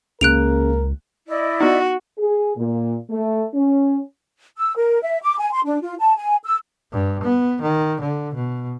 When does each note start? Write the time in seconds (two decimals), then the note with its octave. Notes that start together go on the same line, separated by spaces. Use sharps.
0.21 C#2 C#3 A#3 A#4 F#6 D7 F7
1.28 E4 D5 D#5
1.61 B3 D#4 F#4
2.19 G#4
2.57 A#2
3.10 A3
3.54 C#4
4.57 E6
4.76 A#4
5.02 E5
5.22 D6
5.38 G#5
5.53 C6
5.65 D4
5.82 F4
5.98 A5
6.17 G#5
6.45 E6
6.92 G2
7.23 B3
7.62 D#3
8.01 D3
8.34 B2